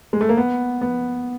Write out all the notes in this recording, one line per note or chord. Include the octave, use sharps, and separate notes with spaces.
G#3
A3
A#3
B3
B3